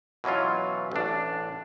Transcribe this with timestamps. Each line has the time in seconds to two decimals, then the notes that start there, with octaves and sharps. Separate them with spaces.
0.24 B2 E3 F#3 C#4 F4
0.92 A1 D4